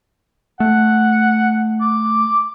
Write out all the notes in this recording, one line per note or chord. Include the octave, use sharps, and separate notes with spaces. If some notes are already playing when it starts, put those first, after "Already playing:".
A3 F#5
D6